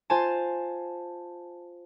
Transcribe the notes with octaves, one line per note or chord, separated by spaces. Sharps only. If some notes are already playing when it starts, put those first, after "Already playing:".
F4 C5 G#5 A5